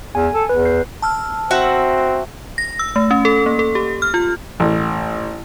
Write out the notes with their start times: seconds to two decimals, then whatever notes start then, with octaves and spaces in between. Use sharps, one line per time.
0.15 E2 G#5
0.34 A4
0.49 E2 B4
0.65 G6 C7
1.02 A5 E6 F6
1.51 C4 F#4 E5 F#5
2.58 A#6
2.79 E6
2.96 A3
3.11 C#4
3.25 A4
3.46 A#3
3.59 A4
3.75 G4
4.02 F6
4.14 F4
4.60 A1